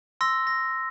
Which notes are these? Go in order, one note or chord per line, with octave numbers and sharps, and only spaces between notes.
C6 E6 A#6
A#6